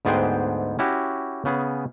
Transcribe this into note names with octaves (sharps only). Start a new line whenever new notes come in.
D2 G#2 B3 G#4 C5 G5
C#4 E4 F#4 G4
C#3 B3 G#4